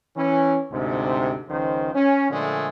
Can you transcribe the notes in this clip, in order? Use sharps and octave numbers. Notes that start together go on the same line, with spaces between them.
E3 C#4
D2 G#2 C3
C#2 D#3 F3 C5
C#4
A#2 D3 F3 G#3 A3